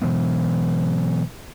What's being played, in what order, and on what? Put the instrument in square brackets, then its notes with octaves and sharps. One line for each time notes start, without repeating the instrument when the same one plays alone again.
[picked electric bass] B2 E3 F#3 B3